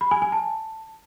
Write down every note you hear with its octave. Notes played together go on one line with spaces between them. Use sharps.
B5
G#5
G#5
A5